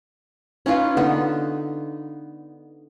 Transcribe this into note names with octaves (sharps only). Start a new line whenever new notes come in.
C#4 D#4 F4 B4
D3 B3 D#4